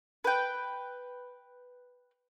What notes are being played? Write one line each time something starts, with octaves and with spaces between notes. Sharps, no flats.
B4 G5